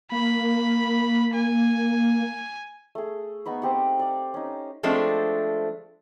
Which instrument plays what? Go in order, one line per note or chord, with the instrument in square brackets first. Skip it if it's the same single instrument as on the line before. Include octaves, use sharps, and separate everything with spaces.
[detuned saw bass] A#3 [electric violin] B5
[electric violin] G#5
[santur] A3 G#4
B3 D#4 B5 C#6
C4 G4 F#5
D5 F5
C#4 D#4
[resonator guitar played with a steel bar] F3 G#3 A3 C4 D4 C5